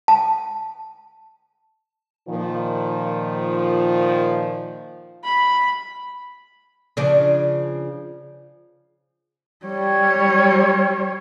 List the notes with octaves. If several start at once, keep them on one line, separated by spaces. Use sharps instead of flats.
A5
A#2 D#3 F3
B5
C#3 F3 D4
G3 C#5